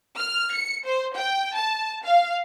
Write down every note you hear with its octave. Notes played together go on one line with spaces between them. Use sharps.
F6
C#7
C5
G5
A5
F5